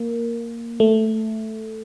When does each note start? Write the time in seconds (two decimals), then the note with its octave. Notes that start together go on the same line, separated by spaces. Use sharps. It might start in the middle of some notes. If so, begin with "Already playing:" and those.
Already playing: A#3
0.80 A3